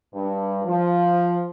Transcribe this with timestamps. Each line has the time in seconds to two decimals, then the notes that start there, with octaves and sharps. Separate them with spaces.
0.13 G2
0.65 F3